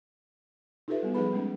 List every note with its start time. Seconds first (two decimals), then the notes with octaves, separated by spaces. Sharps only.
0.88 D#4 F4 G4 A4 B4 E5
1.03 G3 B3 F#4
1.14 F3 G3 D#4 G#4 B4 B5
1.33 G#3 A3 C#4 D#4